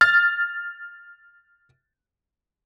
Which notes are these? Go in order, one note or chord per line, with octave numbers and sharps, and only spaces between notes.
F6 A6